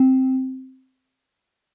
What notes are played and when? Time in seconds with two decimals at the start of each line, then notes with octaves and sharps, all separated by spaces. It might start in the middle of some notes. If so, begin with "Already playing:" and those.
Already playing: C4